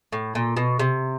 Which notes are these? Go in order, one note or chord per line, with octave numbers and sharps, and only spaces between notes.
A2
A#2
B2
C3